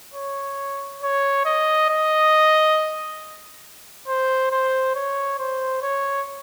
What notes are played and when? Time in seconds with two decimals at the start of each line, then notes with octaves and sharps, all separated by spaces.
0.14 C#5
1.02 C#5
1.45 D#5
1.89 D#5
4.08 C5
4.51 C5
4.95 C#5
5.39 C5
5.82 C#5